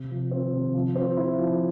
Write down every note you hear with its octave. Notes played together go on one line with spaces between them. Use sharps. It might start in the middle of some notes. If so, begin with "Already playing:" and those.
Already playing: C3
F3
C4
C3
F3
C4
E4
F3